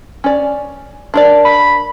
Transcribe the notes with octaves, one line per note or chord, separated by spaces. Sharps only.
C#4 D5
D4 A#4 D5
B5